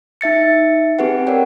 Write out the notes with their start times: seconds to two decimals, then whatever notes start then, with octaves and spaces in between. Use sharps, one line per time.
0.21 D#4 E5 A6 C#7
0.99 C4 G4 G#4 B4 F#5
1.27 A#4 C#5 D5 F#5 G5